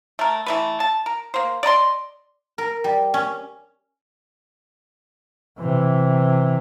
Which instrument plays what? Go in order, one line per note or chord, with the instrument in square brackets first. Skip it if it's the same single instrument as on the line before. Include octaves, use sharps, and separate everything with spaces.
[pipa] A3 A#4
E3 A3 B4
A5
A#4
A#3 C5
D5 D#5 A#5 C6
[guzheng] A#4
G3
C#4
[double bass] C3 E3